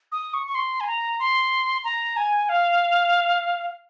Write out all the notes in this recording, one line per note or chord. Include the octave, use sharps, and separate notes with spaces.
D#6
C#6
C#6
C6
G#5
A#5
C6
A#5
G#5
F5